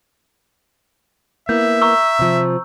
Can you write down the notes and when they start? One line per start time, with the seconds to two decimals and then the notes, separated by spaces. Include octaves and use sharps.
1.49 A#3 B3 E4 E5 G6
1.82 A#5 C#6 E6
2.19 C3 F3